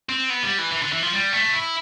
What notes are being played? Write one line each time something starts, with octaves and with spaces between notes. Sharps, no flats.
C4
B3
G3
E3
E3
D3
E3
F3
G3
A3
E4